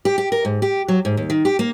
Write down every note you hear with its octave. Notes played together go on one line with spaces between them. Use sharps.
G4
G4
A#4
G#2
G4
F#3
G#2
D#2
D#3
G4
A#3